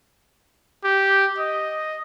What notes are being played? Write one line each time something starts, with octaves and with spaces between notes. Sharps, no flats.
G4
D#5